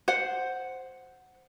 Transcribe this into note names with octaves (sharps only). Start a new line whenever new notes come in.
C5 F#5